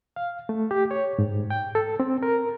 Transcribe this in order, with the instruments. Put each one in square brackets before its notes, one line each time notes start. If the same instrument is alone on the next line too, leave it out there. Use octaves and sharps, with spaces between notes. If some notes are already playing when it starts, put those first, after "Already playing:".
[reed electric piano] F5
A3
G4
C#5
G#2
G5
A4
C4
A#4